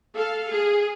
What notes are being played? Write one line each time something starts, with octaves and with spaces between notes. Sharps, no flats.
A4 F5
G#4